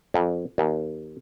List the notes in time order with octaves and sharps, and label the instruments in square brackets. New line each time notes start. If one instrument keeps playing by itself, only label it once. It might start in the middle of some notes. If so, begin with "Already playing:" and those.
[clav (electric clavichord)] F2
D#2